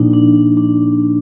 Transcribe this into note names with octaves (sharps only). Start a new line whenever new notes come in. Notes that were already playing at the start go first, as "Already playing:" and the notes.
Already playing: A#2 F3 A#3 D4 D#4
D4
D4
D4